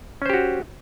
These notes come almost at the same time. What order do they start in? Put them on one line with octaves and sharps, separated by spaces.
C#4 C5 G4 F#4